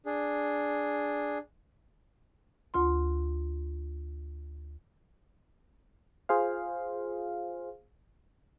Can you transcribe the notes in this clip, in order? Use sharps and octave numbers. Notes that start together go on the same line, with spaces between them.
D4 G#4
D2 F4 C6
F4 G#4 C5 F5